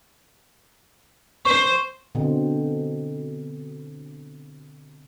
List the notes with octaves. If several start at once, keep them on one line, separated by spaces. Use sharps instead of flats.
C5 C#6
B2 D3 C4